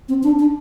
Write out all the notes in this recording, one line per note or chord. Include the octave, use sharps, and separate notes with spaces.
C4
D4
D4